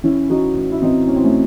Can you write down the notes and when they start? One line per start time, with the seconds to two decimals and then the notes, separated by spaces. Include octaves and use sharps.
0.04 E3 C#4 E4
0.30 E3 D#4 F#4
0.56 A2
0.72 E4
0.82 E3 C4 D#4
1.08 A2 C#4
1.16 C4
1.24 A3 C#4